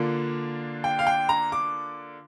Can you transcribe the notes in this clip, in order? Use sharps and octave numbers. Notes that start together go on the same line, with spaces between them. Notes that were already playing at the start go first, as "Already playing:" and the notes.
Already playing: D3 A#3 D4 F4
G5
F5
G5
A#5
D6